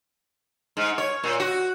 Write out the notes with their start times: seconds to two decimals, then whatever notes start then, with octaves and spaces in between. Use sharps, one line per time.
0.77 G#2
0.98 C#5
1.23 A#2
1.40 F#4